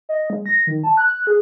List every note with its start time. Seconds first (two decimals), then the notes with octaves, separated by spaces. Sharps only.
0.09 D#5
0.30 G#3
0.46 A#6
0.67 D#3
0.84 A5
0.97 F#6
1.27 G#4